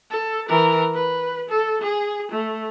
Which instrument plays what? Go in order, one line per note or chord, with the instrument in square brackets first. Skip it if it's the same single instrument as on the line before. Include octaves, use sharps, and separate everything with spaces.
[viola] A4
E3 A#4
B4
A4
G#4
A3